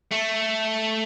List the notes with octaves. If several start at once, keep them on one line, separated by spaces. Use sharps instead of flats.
A3